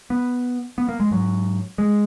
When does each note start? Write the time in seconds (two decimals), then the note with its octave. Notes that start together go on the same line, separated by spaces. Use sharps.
0.10 B3
0.78 B3
0.89 A#3
1.00 G#3
1.11 G#2 F#3
1.78 G#3